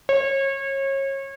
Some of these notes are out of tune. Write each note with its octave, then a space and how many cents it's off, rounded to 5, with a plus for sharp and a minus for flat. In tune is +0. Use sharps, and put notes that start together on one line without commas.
C#5 -30